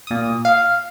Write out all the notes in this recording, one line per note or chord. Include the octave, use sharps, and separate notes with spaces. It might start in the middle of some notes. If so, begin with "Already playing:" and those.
A#2 D#6
F5